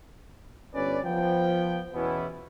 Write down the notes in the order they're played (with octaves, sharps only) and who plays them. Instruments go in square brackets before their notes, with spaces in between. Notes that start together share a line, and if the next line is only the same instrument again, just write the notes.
[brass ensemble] G1 C#4 B4 D5
F3 B3 G5
E2 B2 E3 B3 C#4 E4